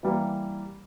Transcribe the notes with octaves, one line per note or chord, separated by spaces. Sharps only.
E3 G3 A#3